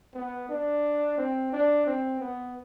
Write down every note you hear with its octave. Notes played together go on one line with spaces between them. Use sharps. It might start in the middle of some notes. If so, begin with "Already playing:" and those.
B3
D4
C4
D4
C4
B3